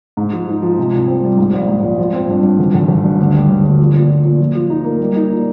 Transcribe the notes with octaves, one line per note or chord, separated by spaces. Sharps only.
G#2
F3
D#4
F3
C3
C2
C4
G3
G#2
A#1
G#2
A#1
F3
C4
G2
G2
G#1
G#1
G#1
G2
D2
G3
D2
D2
F3
A#2
A#2
A#2
F3
F3
D#4
A#3
G3
D#4
A#2